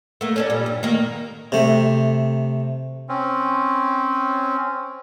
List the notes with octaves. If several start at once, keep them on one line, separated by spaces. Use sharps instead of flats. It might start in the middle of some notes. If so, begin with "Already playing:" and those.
A3 A#3
C#4 A4 D5
A#2 G3
G2
D#3 A#3
C3 A3
C4 C#4